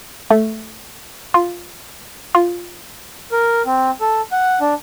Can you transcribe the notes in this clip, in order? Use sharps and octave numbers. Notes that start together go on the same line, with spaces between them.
A3
F4
F4
A#4
C4
A4
F#5
D4